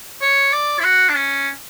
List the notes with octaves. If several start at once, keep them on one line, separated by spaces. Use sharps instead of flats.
C#5
D5
E4
F#4
D4
C#4